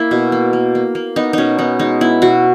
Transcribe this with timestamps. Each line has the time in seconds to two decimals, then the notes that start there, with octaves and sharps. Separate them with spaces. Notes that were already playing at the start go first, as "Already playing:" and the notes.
Already playing: A#3 E4
0.11 B2
0.32 A#3
0.53 A#3
0.75 A#3
0.95 A#3
1.16 B3 D#4
1.33 B2 C#4 D#4
1.59 B3 D#4
1.79 G#3 D#4
2.01 B3 E4
2.22 B2 F#4